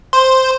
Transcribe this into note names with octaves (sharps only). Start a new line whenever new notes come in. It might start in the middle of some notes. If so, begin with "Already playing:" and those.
C5